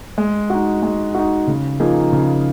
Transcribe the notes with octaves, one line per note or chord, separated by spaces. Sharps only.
G#3
D#4 F#4
G#3
D#4 F#4
C#3
F3 A#3 D#4 G#4
C#3